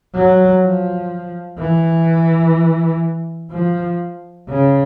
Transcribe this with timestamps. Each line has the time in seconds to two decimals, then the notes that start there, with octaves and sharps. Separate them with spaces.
0.15 F#3
0.62 F3
1.58 E3
3.51 F3
4.48 C#3